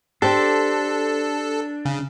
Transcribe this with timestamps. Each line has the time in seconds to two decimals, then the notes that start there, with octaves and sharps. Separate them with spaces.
0.22 D4 G4 A4 C5
1.85 C#3